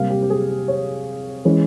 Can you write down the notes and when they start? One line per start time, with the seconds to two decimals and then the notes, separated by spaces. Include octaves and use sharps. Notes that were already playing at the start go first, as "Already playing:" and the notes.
Already playing: C3 G3 A#3 F5
0.10 G4
0.23 G4
0.30 G#4
0.49 G4
0.68 C#5
1.45 E3 G#3 C#4